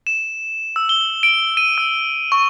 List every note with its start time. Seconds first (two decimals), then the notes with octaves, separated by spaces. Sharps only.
0.07 E7
0.76 E6
0.89 G7
1.23 D7
1.57 D#7
1.78 E6
2.32 C#6